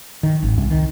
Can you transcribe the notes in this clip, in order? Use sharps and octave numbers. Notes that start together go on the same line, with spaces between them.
D#3
G#1
C2
D#3